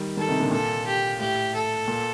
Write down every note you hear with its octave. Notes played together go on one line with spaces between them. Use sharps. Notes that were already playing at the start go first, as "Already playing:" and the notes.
Already playing: D#3 G3
D#3 G3 A4
C3 D#3
A#2 D3
A#2 A4
G4
A2 G4
A4
A#2